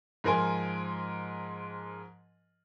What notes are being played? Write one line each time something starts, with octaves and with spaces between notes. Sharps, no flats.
G#2 F3 A#4 G#5 C6